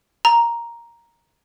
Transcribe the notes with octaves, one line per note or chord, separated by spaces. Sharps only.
A#5